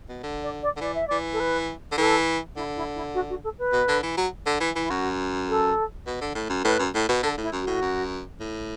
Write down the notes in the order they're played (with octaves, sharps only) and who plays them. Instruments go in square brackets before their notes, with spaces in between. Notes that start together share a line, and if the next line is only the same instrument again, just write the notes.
[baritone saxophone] B2
D3
[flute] D5
D5
[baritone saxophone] D3
[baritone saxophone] E3 [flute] D5
[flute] E5
[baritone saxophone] E3 [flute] D5
[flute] A4
B4
[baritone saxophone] D3
[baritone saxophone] E3 [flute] A4
[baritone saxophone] D3 [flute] E4
[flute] E4
E4
F#4
F#4
A4
B4
[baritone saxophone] B2
D3
E3
F#3
D3
E3
[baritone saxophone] E3 [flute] E4
[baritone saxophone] F#2 [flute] F#4
[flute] A4
[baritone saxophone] B2
D3
A2
F#2
[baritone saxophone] A2 [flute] B4
[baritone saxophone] F#2
A2
B2
[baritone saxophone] D3 [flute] A4
[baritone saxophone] A2
[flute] E4
[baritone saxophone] F#2
[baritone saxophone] A2 [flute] F#4
[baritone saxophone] F#2
A2